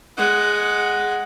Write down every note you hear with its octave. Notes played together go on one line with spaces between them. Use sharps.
G#3 F#5